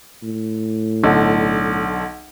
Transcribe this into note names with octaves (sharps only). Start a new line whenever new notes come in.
A2
B1 D3